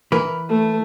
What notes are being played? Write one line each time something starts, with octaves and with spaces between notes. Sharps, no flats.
E3 A#4 B4
A3